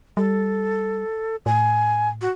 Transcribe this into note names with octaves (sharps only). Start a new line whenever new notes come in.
G3 A4
A2 G#5
F#4